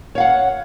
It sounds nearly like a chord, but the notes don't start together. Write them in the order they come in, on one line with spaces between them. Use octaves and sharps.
C#5 F5 F#5